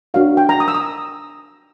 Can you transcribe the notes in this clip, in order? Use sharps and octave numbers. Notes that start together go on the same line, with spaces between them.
D4 F#4 A#4 C#5 F5
G5
A#5
D#6
E6
D#6